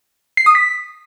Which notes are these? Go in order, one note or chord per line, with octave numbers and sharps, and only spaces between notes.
C7
D#6
B6